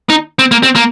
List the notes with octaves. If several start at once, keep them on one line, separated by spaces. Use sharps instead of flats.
D#4
C4
A#3
C4
A#3